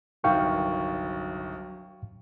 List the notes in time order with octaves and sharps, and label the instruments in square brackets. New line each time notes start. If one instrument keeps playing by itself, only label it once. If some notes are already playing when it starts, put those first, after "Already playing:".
[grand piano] G1 C2 D#3 [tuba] F#3 [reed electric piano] F5 G5 C#6